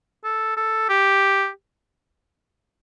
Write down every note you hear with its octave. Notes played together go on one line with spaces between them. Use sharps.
A4
A4
G4